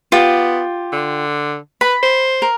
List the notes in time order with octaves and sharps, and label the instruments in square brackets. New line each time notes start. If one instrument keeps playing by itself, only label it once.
[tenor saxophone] B3 [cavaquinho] F4 G4
[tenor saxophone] D3
[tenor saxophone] B4 [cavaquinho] B5
[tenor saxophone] C5
[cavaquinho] A#4